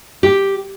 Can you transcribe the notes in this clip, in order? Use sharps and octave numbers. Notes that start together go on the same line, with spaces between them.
G4